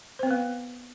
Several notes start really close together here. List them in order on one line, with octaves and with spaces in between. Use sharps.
C5 C4 B4 B3